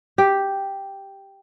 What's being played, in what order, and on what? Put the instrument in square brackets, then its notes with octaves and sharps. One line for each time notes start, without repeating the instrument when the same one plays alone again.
[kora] G4